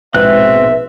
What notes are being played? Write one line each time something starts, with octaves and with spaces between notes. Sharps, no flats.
A#1 G#2 B2 C4 B4 E5 F#6